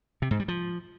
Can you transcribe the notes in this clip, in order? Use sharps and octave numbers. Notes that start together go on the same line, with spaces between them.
C3
G#2
G3
F3